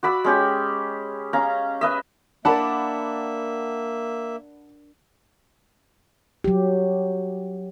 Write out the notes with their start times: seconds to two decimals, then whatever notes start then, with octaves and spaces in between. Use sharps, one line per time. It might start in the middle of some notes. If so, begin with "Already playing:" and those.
0.03 F#4 D5 B5 E6
0.24 G#3 C#4 G4
1.33 C#4 F5 A#5
1.81 B4 D#5 E5
2.45 A#3 D4 A#4 D5 E5 F#5 A5 B5
6.44 F#3 G4